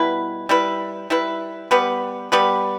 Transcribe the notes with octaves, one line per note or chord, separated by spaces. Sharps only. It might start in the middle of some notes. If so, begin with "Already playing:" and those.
Already playing: B2 G3 E4 B4
G3 E4 B4
G3 E4 B4
G3 B3 G4 B4
G3 B3 G4 B4